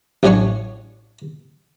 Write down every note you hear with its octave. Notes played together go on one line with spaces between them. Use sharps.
A1 A2 F#3 D4 G#5 C#6